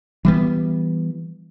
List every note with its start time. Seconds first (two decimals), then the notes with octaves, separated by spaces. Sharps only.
0.25 E3 G3 B3